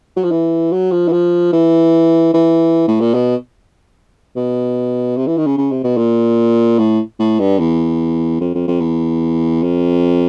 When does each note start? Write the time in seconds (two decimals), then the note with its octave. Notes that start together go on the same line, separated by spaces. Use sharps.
0.17 F#3
0.24 F3
0.31 E3
0.72 F#3
0.92 F3
1.08 E3
1.12 F3
1.53 E3
2.34 E3
2.88 A2
3.00 A#2
3.14 B2
4.36 B2
5.17 C3
5.27 E3
5.37 D#3
5.47 C#3
5.58 C#3
5.72 C3
5.84 B2
5.97 A#2
6.79 A2
7.19 A2
7.40 G2
7.59 E2
8.41 F2
8.55 F2
8.68 F2
8.81 E2
9.63 F2